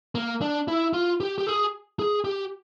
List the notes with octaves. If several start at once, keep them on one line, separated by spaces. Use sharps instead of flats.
A#3
D4
E4
F4
G4
G4
G#4
G#4
G4